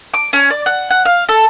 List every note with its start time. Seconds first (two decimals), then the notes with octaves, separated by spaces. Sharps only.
0.14 D6
0.33 C#4
0.50 D5
0.66 F#5
0.90 F#5
1.05 F5
1.29 A4